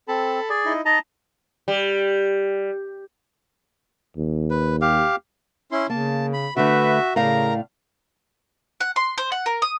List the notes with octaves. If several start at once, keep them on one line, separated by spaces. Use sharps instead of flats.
C4 A4 A5 B5
G#4 D5
D#4 E4 D#5
D#4 D#5 A5 A#5
G3
D#2
B4
G4 F5
C#4 E4 C6
C#3 A#3 A5
B5
D3 A3 F#4 B4 E5
A2 C#3 A#4 D5 F5 A#5
F#5
C6
C5
F#5
A#4
D#6